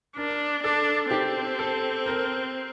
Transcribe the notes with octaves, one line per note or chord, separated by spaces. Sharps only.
D4 A#4
D4 A4
C4 G4
A4
A#4